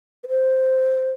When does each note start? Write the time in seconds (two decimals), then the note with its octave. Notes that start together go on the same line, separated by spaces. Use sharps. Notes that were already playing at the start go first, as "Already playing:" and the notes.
0.24 B4
0.28 C5